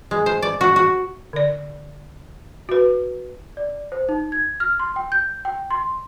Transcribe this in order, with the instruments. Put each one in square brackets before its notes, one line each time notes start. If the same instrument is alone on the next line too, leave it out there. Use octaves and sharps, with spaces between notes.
[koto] G#3
C5
D5
F#4
F#4
[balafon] D3 D5
F#4 B4
[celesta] D5
C5
D#4
G#6
F6
C6
G5
G6
G5
C6